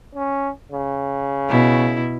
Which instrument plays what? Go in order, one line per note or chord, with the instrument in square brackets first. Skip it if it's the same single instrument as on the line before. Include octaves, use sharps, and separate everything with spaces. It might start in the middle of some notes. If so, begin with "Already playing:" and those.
[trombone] C#4
C#3
[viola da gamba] B2 E4